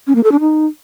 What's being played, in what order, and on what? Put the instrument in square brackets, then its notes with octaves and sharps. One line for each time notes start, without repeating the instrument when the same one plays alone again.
[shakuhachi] C#4
A#3
A4
D4
D#4